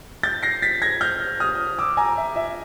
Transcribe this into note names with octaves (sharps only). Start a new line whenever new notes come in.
G6 A6
A#6 C7
A6 B6
G#6 A#6
F6 G6
D#6 F6
D6 E6
G#5 A#5
E5
E5